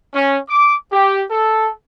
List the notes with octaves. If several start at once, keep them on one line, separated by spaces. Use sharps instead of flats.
C#4
D6
G4
A4